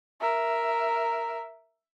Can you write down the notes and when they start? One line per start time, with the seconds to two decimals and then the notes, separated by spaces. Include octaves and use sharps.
0.21 A#4 E5